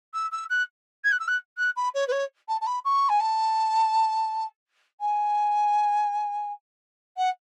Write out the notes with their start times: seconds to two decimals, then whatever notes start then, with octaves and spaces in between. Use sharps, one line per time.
0.14 E6
0.32 E6
0.50 F#6
1.04 G#6
1.12 F#6
1.19 E6
1.27 F#6
1.57 F#6
1.76 B5
1.94 C#5
2.07 B4
2.11 C#5
2.48 A5
2.61 A5
2.66 B5
2.84 C#6
3.09 G#5
3.20 A5
5.00 G#5
7.17 F#5